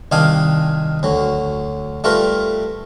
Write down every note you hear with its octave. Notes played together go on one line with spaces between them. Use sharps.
C2 D#3 D4 D#4 F5 G#5
D2 F#3
G3 A3 F4 A#4 B4